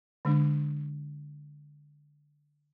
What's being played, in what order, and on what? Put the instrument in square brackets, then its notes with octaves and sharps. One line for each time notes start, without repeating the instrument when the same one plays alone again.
[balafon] D3 G#3 D4